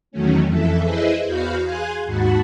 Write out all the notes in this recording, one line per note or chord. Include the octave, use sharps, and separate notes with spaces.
E2 D#3 F#3 A3 C#4
F2 E3 A4 E5
E4 G#4 B4 C5 D#5 E5
E2 F#4 F5 B5 F6 G6
G#4 F5 G#5 C6 F#6 G#6
D#2 G#2 F#4 F#5 A5 B5